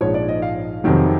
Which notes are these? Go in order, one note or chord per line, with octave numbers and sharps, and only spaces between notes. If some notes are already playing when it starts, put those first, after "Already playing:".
A#1 G#2 F3 C#5
D5
D#5
F5
F2 C3 D#3 F#3